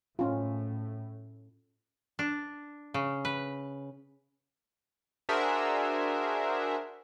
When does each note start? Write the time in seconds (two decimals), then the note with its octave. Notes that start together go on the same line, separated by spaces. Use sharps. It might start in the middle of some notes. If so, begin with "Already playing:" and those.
0.19 A2 C#4 F4
2.19 D4
2.94 C#3
3.25 B4
5.29 D4 F#4 G#4 A#4 C5 E5